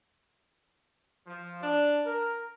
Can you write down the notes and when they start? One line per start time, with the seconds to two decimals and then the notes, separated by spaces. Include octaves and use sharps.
1.27 F3
1.62 D4
2.05 A#4